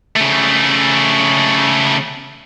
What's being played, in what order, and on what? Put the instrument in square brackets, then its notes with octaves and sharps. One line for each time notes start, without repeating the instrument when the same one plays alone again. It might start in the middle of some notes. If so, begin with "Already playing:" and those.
[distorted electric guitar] C#3 A3